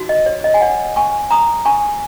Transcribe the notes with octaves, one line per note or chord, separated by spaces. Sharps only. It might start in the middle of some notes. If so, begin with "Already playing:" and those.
Already playing: D#4 F#4
D#5
C#5
D#5
G#5
C#5 F#5
G#5 C#6
A#5 D#6
G#5 C#6